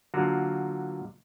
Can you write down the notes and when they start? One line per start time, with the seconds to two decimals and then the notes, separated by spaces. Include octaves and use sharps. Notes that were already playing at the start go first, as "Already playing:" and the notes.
0.14 D3 F#3 A#3 F4 F#4 A#4